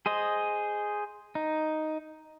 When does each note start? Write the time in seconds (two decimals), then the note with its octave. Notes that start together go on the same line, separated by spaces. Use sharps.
0.06 G#4 C5 D#5
1.35 D#4